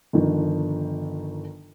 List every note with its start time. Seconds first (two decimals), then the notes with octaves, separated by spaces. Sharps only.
0.13 G1 D#3 F3